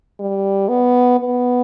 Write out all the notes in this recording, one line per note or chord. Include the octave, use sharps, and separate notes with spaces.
G3
B3
B3